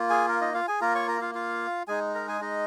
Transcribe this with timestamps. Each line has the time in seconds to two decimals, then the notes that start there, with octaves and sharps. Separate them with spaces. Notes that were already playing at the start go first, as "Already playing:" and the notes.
Already playing: A#3 F4
0.10 G#4 G#5
0.28 A#4
0.41 D#4 D#5
0.54 F4 F5
0.68 G#4 G#5
0.81 A#3 F4 A#4 A#5
0.95 C#5 C#6
1.07 A#4 A#5
1.21 F4 F5
1.35 F4 F5
1.88 G#3 D#4 G#4 G#5
2.14 A#4 A#5
2.28 G#4 G#5
2.41 D#4 D#5